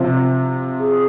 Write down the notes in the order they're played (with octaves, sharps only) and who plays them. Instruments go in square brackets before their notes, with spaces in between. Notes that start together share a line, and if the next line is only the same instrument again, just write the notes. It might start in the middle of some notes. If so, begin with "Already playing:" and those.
Already playing: [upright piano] C3 F3
[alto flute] G#4